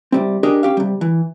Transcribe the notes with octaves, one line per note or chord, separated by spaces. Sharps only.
C2 G3 C4
D4 G4 G#4 A#4 D5 D#5
C#4 G4 F5
C3 G3
E3